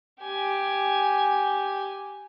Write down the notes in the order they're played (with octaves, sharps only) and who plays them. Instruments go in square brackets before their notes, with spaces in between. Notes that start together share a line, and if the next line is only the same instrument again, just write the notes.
[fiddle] G4 G#5